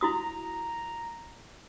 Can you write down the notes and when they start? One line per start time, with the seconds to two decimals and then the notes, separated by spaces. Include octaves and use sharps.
0.01 E4 F#4 A#5 D#6